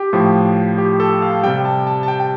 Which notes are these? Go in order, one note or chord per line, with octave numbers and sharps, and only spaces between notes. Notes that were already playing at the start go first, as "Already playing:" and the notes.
Already playing: G4
A2 F3
G4
A4
F5
C3 G3 G5
A5
A5
A5
G5
G5